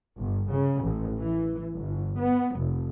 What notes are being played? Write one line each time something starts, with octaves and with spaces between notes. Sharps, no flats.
G1
C#3
A1
E3
G1
B3
F1